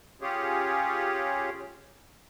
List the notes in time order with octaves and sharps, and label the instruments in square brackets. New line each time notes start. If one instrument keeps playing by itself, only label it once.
[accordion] C#4 F4 G4 G#4 C#5